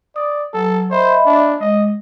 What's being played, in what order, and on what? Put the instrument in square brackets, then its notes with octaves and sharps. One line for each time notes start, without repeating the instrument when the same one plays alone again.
[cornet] D5 [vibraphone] D#6
[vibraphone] F#3 F#5 [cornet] A4
[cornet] C5 [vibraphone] D#5 E5 B5
[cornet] D4
[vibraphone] G#3 [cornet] D#5